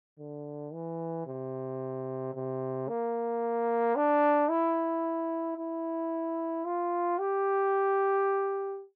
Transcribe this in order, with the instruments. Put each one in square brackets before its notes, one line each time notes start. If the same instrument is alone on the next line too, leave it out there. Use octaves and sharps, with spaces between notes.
[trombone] D3
E3
C3
C3
A#3
D4
E4
E4
F4
G4